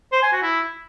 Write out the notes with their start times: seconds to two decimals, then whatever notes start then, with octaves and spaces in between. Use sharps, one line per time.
0.12 C5
0.23 G#5
0.33 F#4
0.43 E4